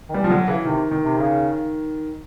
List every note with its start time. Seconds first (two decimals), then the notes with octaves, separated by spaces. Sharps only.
0.09 D#3
0.14 E3 G3
0.24 F3
0.30 D3 F#3
0.48 C#3 E3
0.65 C3 D#3
0.91 D#3
1.04 C3
1.17 C#3